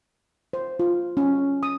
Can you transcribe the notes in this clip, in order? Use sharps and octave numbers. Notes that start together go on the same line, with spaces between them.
C5
F4
C#4
D#6